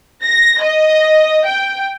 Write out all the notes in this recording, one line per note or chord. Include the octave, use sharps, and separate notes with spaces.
A#6
D#5
G5